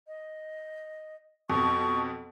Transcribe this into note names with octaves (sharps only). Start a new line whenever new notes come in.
D#5
F2 B2 C#6